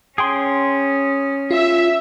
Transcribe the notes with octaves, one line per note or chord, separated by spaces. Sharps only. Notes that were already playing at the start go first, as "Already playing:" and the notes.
C#4 G#4 G5 C6
F4 E5